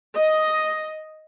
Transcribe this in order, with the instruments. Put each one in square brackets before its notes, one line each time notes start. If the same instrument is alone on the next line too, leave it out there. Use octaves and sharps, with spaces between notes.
[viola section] D#5